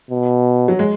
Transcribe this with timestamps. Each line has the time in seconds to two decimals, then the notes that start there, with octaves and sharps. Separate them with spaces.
0.11 B2
0.68 F#3
0.79 G#3